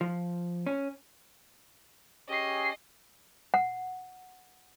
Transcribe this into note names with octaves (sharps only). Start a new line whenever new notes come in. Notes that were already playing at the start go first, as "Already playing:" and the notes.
F3
C#4
C#4 G4 G#4 D#5 C7
F#5